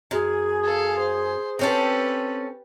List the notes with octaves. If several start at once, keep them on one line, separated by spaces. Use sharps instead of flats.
F#2 G#4
A4 F5
C5
C4 C#4 G4 A4 B4